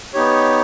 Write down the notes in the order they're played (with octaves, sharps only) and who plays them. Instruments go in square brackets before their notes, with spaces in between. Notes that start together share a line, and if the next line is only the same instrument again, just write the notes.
[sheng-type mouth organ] B3 D#4 G4 C#5